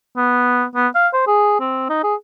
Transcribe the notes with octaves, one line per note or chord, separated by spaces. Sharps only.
B3
B3
F5
C5
G#4
C4
D#4
G#4